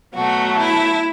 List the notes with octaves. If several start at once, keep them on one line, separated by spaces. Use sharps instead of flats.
B2 F#3 A3 F#4
E4